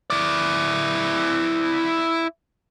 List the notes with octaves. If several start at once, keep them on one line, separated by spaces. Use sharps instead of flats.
E4 D5